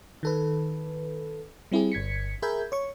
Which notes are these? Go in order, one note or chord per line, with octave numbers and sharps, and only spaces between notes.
D#3 A4 B4
G3 C4 E4 G4 G#4
G1 G#6 B6 C#7
G#4 A#4 E5 B5 G6 G#6
C#5 C#6